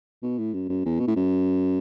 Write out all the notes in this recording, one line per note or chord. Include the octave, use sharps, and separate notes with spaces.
B2
A2
F#2
F#2
E2
B2
A2
F#2